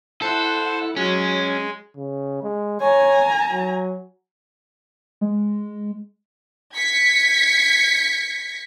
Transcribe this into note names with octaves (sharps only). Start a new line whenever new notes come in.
E4 A4 C5 F#5
F#3 G#3 C#4
C#3
G#3
C#5 G#5 A#5
F#3
G#3
G#6 B6 C#7